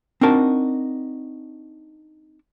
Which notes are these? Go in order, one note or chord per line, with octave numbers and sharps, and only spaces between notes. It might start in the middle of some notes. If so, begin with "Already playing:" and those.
C4 D4 D#4 F#4 A#4 A5